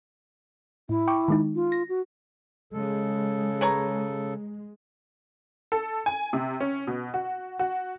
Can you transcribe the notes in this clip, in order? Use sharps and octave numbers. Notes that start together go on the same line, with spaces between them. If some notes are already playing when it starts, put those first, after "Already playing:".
A2 E4
G5 C#6 D6
D#3 G#3 D#4
F4
A#6
F#4
C#3 G#3 A4
B4 C#5 A#5
A4
G#5
C3
C#4
B2
F#4
F#4